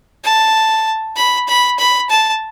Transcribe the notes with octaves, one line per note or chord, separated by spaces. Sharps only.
A5
B5
B5
B5
A5